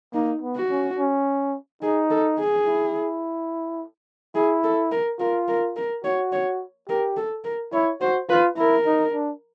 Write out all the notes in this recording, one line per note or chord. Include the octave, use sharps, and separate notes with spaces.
A#3 D#4
B3
F#4
C#4
C#4
D#4 G#4
A4
G#4
E4
E4 G#4
A4
A#4
F4 A#4
A#4
A#4
F#4 C#5
C#5
G4 A#4
A4
A#4
E4 C#5
F#4 C5
F4 B4
E4 A#4
D#4
D4